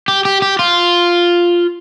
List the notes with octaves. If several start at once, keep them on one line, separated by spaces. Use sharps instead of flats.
G4
G4
G4
F4